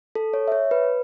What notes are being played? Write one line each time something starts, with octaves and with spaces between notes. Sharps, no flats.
A4
C#5
E5
C#5
B4